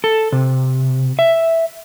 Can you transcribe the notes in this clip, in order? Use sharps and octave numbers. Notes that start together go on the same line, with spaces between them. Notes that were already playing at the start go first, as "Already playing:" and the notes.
A4
C3
E5